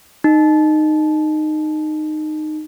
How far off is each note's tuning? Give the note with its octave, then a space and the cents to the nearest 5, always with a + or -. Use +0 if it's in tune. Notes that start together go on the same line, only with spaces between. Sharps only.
D#4 -15